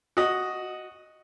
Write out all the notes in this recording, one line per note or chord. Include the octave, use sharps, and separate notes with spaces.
F#4 D#5